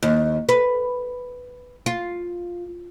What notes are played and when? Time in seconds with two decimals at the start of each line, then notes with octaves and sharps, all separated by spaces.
0.03 D#2
0.49 B4
1.86 F4